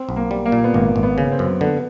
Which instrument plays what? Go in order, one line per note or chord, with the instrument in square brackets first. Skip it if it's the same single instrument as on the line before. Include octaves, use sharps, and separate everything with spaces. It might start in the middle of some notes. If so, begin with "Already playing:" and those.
Already playing: [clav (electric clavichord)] C4
B1
[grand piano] A#3
[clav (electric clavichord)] G3
[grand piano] A#3
[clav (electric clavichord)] A#2
[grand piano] B3
[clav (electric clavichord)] G#1 [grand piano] A#3
[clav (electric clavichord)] G#1
[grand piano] B3
[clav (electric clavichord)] C#3
[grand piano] C4
[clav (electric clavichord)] F#2
[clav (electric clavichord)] D3 [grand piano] B3